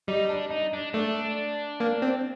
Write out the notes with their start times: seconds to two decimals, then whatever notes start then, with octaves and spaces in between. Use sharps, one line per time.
0.08 G3 D#4
0.29 D4
0.50 D#4
0.73 D4
0.94 A3 D4
1.80 A#3
2.02 C4